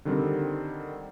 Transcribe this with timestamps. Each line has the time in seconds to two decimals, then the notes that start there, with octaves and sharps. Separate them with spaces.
0.05 D3 D#3 G3 C4